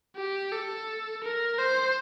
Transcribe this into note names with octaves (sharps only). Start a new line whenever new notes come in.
G4
A4
A#4
C5